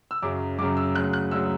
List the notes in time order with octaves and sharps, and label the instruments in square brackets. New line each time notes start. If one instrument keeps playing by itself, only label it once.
[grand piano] E6
F#2 C#3 F#3 D6
F#2 C#3 F#3 D6
E6
D2 C#3 F#3 F#6
F#6
D2 C#3 F#3 E6